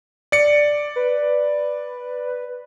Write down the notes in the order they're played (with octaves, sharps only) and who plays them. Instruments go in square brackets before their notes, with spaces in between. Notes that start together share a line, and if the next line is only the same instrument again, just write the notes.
[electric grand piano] D5 C#7
[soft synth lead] B4